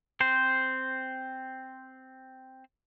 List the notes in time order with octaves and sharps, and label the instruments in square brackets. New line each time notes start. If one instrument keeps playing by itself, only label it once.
[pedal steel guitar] C4 C5